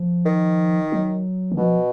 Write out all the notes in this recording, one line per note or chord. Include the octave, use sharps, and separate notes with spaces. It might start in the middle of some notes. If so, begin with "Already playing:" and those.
Already playing: F3
D#3
F#3
D#3
B2 F3